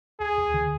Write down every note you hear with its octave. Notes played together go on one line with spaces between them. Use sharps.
D2 G#4
D2
D3